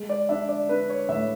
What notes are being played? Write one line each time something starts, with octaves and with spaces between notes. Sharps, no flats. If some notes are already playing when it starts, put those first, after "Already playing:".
Already playing: G#3
D5
D4 E5
D5
D4 B4
C#5
A2 E5